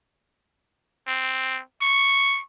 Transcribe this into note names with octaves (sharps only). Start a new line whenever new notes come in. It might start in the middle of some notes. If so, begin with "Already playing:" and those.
C4
C#6